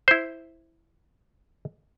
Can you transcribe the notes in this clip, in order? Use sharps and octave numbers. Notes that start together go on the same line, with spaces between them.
E4 C5